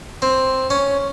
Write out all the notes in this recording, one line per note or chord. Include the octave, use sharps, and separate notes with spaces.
C4
C#4